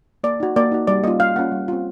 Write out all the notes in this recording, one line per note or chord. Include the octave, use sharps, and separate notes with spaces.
A#3 D5
D#4 F#4
A#3 D5
D#4 F#4
G3 D5
A#3 C#4 F4 D#5
G3 F5
A#3 C#4 F4 F#5
G3
C4 F4